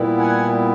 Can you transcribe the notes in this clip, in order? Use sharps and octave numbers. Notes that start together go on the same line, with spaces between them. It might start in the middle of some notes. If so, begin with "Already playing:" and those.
Already playing: A#2 G3 B3 E4
F#5 G#5